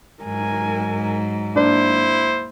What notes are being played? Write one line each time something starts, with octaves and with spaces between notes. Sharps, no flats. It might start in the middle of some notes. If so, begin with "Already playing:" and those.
G#2 F#3 A#4 G#5
A#3 D4 E4 C5